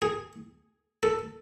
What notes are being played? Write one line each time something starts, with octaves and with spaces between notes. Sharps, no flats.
G#4
A4